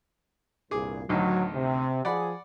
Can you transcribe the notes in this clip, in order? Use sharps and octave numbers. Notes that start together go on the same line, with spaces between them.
C2 G2 A#2 G#4 D6
A1 D2 D#3 F#3
C3
F3 G#4 D5 F#5 B5